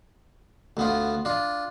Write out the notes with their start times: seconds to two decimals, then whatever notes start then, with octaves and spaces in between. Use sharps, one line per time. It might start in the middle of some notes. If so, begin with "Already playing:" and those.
0.77 D2 B3 F4
1.25 D4 F4